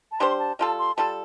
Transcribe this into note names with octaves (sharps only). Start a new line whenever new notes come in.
A5
G3 D4 G4 C5 C6
A5
G3 F4 A4 A5
C6
G3 F4 A4 A5